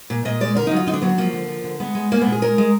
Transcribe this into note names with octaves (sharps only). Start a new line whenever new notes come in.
A#2
A#2 D#5
G#3 D5
D3 A#4
D#4
F#3 F4
D3 D#4
D4
F#3 B3
D4
F3 A#3
D3
F3
D3
G#3 B3
G#3
G#3 A#3
B3
A#2
G#4
G#3 A#4
G#3